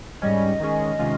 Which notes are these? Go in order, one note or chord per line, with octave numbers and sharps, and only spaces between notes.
G#2 G3 C#4 D#5
D#3 G#3 C#4 G#4
C3 D#3 G#3 C#4 F4